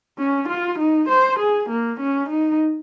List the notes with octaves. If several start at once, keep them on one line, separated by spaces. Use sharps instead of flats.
C#4
F4
D#4
C5
G#4
A#3
C#4
D#4